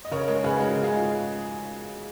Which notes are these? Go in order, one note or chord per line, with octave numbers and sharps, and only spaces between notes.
D#5
C#3 A#4 C#5
G#3 A#4 C#5
C#3 G#4 B4
G#3 F#4 A#4
C#3
F4 G#4
G#3